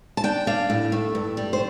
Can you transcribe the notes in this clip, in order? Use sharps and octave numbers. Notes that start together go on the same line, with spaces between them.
A5
D4 G5
D4 F5
A2
A3
G2
G3
C5